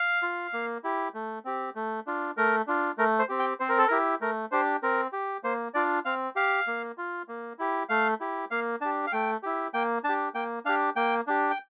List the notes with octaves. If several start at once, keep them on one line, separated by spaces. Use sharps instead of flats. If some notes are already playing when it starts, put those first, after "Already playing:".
Already playing: F5
F4
A#3
E4 G4
A3
C4 G4
A3
D4 F4
A3 A#4
D4 F4
A3 A#4
C5
C4 G4
G5
C4 C5
A#4
A4
E4 G4 A#4
A3 A#4
D4 G4 C5
C4 A#4
G4
A#3 C5
D4 F4 D5
C4 F5
G4 F5
A#3
F4
A#3
E4 G4
A3 F5
E4 G4
A#3 F5
D4 G4 A5
F5
A3 G5
E4 G4
A#3 G5
D4 A5
G4
A#3 G5
D4 G4 F5
A#3 G5
D4 G4
G5